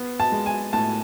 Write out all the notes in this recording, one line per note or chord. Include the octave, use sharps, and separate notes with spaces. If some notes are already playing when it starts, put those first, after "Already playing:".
Already playing: B3
A5
G#3
G#5
A2 A5